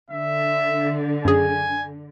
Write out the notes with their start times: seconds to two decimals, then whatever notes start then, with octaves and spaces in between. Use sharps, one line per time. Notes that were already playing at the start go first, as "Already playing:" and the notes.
0.10 D3 E5
1.25 F#2 G#4 G#5